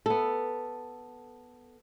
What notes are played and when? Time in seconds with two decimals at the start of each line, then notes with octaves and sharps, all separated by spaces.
0.06 B3 A4